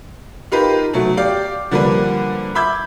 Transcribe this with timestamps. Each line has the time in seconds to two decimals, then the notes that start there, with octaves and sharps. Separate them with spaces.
0.52 D#4 F4 G4 A#4 B4
0.93 B2 F#3 A3
1.17 G4 D5 F5 D6
1.71 D3 F3 G3 A#3 D4 B4
2.55 E5 B5 D6 E6 G6 G#6